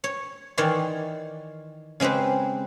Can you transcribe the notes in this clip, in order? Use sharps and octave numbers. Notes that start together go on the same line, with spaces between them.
C#5
D#3 E3 C#5 D5 C6
C#3 G#3 C4 G4 B4